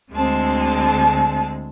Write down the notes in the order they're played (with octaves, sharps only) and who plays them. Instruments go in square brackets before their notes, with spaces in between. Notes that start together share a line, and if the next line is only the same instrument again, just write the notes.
[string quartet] D2 D3 G#3 C4 A5